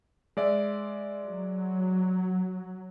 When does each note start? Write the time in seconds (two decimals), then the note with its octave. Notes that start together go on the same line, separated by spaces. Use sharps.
0.37 G#3 D5 E5
1.26 F#3